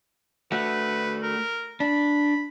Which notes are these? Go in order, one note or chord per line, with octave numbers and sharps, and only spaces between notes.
A3 F#4 B4
A#4
D4 B5